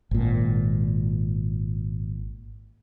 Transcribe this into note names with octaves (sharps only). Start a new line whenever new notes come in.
G#1 A#2